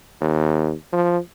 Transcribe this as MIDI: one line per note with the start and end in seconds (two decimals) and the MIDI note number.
0.21 0.73 39
0.92 1.18 53